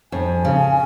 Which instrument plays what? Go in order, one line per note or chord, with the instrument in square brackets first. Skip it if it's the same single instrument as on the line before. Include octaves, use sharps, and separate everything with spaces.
[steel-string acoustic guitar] F2 [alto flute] G#5
[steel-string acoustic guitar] C#3